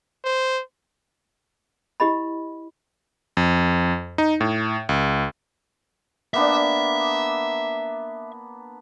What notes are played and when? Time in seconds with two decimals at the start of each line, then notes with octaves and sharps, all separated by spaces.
0.24 C5
2.00 E4 G4 D#5 B5
3.37 F2
4.18 D#4
4.41 A2
4.89 C#2
6.34 A#3 B3 D4 E5